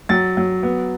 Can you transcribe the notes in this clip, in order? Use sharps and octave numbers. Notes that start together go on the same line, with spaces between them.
F#3 A6
F#3
B3